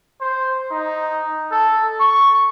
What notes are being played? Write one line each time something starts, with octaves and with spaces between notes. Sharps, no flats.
C5
D#4
A4
C#6